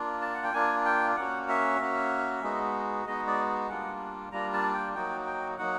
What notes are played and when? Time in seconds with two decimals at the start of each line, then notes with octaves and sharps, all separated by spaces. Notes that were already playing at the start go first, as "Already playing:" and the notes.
Already playing: A#3 D4 F4
0.21 A5
0.34 F#5
0.43 G5
0.53 A#3 D4 F4 G#5
0.85 G5
1.16 A#3 C#4 F#4 F#5
1.49 E5
1.79 A#3 C#4 F#4
2.43 G#3 B3 D#4 F#4
3.06 G#3 B3 D#4 F#4 D#5
3.27 D5
3.69 G3 A#3 D4 F4 F#5
4.32 G3 A#3 D4 F4 A#5
4.53 A5
4.74 G5
4.95 F#3 A#3 D#4 F#4 G5
5.26 G5
5.58 F#3 A#3 D#4 F#4 F#5